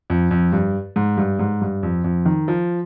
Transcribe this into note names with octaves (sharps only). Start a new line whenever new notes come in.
F2
F2
G2
G#2
G2
G#2
G2
F2
F2
D#3
F3